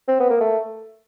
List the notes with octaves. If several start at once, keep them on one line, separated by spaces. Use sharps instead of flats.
C4
B3
A#3
A3